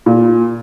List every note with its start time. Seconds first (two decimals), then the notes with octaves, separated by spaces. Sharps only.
0.06 A#2